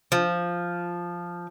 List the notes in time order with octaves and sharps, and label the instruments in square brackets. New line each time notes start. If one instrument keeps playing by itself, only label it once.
[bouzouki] F3